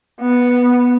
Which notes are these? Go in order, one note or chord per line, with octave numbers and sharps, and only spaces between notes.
B3